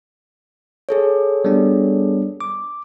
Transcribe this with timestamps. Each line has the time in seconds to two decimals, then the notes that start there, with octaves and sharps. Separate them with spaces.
0.89 G#4 A4 C#5
1.45 G3 B3 D4
2.41 D6